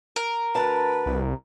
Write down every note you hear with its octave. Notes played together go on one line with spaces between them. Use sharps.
A#4
D2 B4 A5
C2